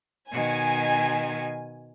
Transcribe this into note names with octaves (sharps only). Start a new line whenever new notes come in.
B2 D#3 G#5